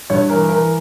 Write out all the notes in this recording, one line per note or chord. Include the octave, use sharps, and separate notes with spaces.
G2 C#5
E3 A#4
E3 A#4